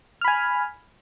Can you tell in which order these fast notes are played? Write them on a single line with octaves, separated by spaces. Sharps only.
F6 B5 G#5